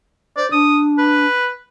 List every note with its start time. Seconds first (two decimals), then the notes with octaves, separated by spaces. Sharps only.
0.37 C5 D5
0.52 D4 D#6
0.98 B4